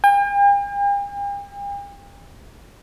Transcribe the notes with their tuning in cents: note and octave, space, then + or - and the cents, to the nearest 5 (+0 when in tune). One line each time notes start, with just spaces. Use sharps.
G5 +45